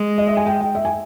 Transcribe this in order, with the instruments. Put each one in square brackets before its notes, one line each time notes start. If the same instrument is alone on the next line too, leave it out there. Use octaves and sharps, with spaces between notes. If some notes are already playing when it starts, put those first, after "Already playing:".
Already playing: [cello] G#3
[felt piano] D#5
E5
G#5
G5
G5
E5
G#5